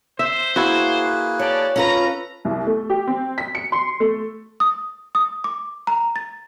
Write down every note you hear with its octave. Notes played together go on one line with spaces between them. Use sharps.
C5 E5
A#3 E4 F#4 G#4 B4
G4 C#5 D5 A5
C#4 F4 A4 B4 A#5
C2
A3
G4
C4
B6
C#7
C6
A3
D#6
D#6
D6
A#5
A6